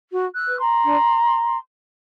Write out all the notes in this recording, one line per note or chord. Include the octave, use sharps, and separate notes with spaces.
F#4
E6 F#6
B4
A#5 C6
D4